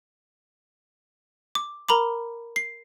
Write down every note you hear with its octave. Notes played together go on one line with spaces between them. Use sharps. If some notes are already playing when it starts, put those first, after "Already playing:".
D6
A#4 A#5 B5 D6
C7